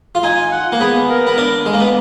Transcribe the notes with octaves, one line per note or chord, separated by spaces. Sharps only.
F4
D#4 G#5
F#5
A#3
B3 G#4
A#4
B3
D4
G#3
A#3
B3